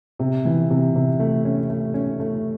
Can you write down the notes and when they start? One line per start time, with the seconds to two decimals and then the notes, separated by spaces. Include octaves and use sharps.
0.19 C3
0.45 E3
0.70 C3
0.95 C3
1.20 A3
1.45 C#4
1.69 A3
1.94 C#4
2.20 A3